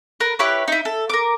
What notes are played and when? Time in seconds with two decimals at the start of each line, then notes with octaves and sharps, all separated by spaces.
0.20 A#4 B4
0.39 E4 G4 B4 C#5
0.68 D#4 E4
0.85 A4
1.09 A#4 D6